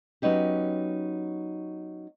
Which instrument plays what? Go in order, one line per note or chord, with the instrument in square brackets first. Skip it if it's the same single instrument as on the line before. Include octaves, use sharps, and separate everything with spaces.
[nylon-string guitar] F#3 B3 C#4 D#4 G4